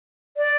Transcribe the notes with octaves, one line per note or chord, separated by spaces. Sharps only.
D5